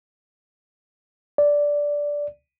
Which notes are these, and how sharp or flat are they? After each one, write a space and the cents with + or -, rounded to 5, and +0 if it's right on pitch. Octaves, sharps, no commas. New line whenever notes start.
D5 -10